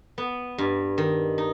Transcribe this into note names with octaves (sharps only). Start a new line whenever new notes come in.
B3
G2
D#3
D#4